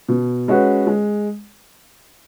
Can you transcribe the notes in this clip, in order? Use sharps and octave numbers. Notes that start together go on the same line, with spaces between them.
B2
G#3 C#4 F#4 B4
G#3